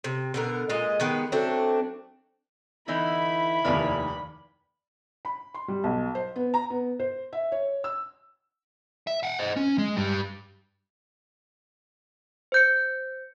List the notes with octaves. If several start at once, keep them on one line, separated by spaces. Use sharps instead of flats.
C3
B2 D3 A#4
A#2 G#3 D#5
D#3 G#3 B3 G4
F#3 A3 C4 D4
D3 E3 D#4 E4 B5
F1 D#2 B4 D5 F5
B5
C6
G3
B1
C5
B3
A#5
B3
C5
E5
C#5
E6
E5
F5 F#5
C5 D#5
C#4
G#3
G2 G3
C5 G6 C#7